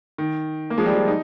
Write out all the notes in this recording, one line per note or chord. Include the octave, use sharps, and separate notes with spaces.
D#3
A#3
F3 G#3
G3
F3
D#4